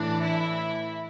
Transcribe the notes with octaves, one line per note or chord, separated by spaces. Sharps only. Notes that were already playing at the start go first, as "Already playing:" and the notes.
Already playing: A2 E3 D4
E4